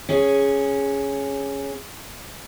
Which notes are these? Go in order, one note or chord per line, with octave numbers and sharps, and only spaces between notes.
C#4 G#4